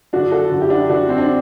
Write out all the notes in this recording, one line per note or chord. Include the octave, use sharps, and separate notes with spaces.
F#2 D3 D4 F#4
F#4 A4
F#2 D3
E4 G4
D4 F#4
F#2 D3 D4 F#4
C4
D4